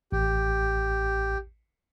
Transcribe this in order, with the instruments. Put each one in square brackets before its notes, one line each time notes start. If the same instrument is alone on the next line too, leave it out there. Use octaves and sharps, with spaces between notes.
[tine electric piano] A1 [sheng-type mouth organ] G4